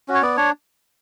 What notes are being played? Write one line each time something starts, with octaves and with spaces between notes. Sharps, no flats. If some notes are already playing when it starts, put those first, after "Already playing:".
C#4 F#4
C#5
B3 D5
D4 C#5